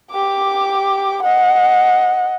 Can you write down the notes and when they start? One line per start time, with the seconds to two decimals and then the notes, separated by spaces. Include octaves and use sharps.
0.11 G4 D6
1.22 D#5 F#5